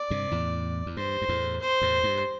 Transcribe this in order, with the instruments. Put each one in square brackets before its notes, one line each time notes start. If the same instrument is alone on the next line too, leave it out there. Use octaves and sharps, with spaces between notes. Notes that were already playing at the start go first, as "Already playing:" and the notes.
Already playing: [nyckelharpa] D5
[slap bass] G2 C3
E2 A2
E2
[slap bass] G2 [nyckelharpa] C5
[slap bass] G2
E2 A2
[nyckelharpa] C5
[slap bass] E2 A2
G2